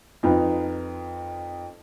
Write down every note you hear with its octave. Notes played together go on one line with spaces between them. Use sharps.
F2 D#4 F4 B4